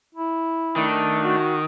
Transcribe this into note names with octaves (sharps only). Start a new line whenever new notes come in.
E4
D#3 A3 D4
F#4